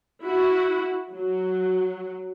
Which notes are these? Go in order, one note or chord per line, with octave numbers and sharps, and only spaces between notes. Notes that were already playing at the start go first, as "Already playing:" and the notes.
E4 F#4
F#3